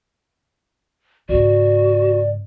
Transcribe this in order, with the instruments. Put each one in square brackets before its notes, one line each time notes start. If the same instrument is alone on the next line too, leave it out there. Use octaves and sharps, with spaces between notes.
[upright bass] G#2 C#3 [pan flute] F#4 [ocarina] D5